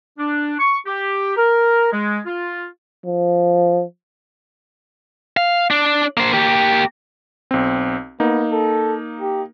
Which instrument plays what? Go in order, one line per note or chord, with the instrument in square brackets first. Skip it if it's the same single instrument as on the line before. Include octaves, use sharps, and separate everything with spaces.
[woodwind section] D4
C#6
G4
A#4
G#3
F4
[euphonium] F3
[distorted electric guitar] F5
D4
A#3 C5
A#3 G4
[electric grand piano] B1 C4
[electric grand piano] A#3 D#4 [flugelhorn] B3
[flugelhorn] A4
G4